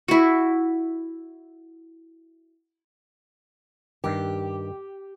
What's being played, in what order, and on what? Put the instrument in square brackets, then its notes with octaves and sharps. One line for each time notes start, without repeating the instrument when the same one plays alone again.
[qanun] E4 F#4
[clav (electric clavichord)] G2 D#3 [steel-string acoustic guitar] G4